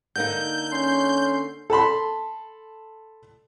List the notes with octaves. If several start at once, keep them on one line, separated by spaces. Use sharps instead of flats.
D3 A#3 D#4 G6
C#4 C6
A4 A5 B5 C6